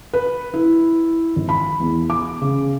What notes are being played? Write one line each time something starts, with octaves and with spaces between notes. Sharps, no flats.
B4
E4
G#1
B5
E2
D6
C#3